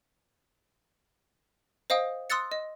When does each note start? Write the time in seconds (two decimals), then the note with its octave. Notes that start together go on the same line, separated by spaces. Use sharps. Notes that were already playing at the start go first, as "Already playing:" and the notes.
1.90 C5 D#5 F5 G5 D#6
2.30 C6 D#6 E6 F#6 A6 C#7
2.51 D#5